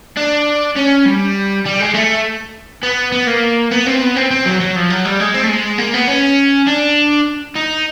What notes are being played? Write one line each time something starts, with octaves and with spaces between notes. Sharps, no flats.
D4
C#4
G3
G3
G#3
A3
B3
B3
A#3
B3
C4
B3
C4
C4
F#3
F#3
F3
F#3
G3
G#3
C4
A3
G#3
A#3
B3
C#4
D4
D#4